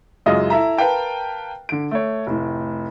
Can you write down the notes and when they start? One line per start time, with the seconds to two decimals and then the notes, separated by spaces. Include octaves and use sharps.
0.26 F#2 C#3 G#3 E4 F4 D#5
0.50 E4 A4 E5 A#5
0.77 A#4 B4 F5 G5 A5
1.69 D3 D7
1.91 A3 C#5
2.27 F1 A2